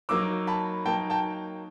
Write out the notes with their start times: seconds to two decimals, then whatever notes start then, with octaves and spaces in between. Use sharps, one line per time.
0.09 F#3 A#3 D#4 D6 E6
0.47 A5 B5
0.86 F#3 A#3 D#4 G5 A5
1.10 G5 A5